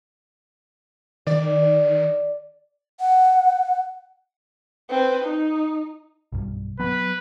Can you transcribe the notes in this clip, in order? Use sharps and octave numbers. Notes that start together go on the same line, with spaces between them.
D#3 D5
F#5
C4 B4
D#4
B1 G2
F#3 B3 B4